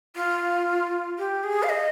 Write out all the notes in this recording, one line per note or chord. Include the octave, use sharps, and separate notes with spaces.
F4
G4
G#4
F5
D#5